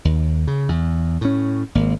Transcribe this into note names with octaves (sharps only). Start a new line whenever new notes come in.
D#2
C#3
E2
A2 C#4
G#1 A#3